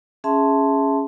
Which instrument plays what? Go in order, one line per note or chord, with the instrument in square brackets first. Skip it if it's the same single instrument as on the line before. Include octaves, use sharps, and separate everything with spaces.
[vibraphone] C#4 G#4 E5 A5 C6